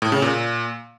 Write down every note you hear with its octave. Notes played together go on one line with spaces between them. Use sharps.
A2
C#3
A#2